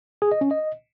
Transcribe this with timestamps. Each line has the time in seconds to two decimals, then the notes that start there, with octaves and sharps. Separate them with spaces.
0.22 G#4
0.32 D#5
0.41 C#4
0.51 D#5